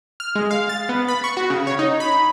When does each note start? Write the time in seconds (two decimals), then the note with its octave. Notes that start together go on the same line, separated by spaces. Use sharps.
0.20 F6
0.35 G#3
0.51 F5
0.69 A6
0.89 B3
1.08 B5
1.24 C#6
1.37 F#4
1.50 C#3
1.67 C#5
1.79 D#4
2.00 B5